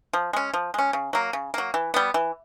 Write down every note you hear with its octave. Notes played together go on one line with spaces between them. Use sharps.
F3
G#3 C#4
F3
G#3 C#4
C#3
F#3 A#3
C#3
F#3 A#3
E3
G3 B3
E3